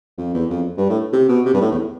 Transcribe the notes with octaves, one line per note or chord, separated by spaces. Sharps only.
F2
E2
F2
G2
A2
C3
B2
C3
G2
A2
E2